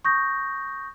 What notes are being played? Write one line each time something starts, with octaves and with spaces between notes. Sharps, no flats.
C#6 D#6 G6 A#6